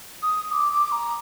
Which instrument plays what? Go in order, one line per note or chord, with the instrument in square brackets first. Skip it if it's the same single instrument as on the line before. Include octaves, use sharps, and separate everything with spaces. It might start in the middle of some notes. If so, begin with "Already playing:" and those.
[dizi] D#6
D6
D6
A#5